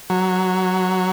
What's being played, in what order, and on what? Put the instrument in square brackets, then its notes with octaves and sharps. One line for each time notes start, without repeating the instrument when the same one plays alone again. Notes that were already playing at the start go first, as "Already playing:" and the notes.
[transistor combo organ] F#3